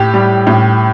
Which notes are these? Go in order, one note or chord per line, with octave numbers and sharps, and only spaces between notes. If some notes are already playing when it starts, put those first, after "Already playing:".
Already playing: A2 G4
G3
A2